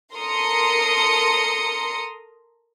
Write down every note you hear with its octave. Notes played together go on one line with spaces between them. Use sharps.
A4 A#4 A#5 C6 D#6 C#7